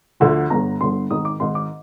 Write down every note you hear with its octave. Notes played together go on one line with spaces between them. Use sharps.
D2 D3 F3
G1 G2 D3 A#5
G1 G2 D3 C6
G#1 G#2 D#3 D#6
D6
G#1 G#2 D#3 C6
D6